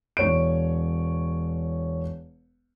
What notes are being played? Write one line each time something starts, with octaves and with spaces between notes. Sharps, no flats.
E1 C#5 D7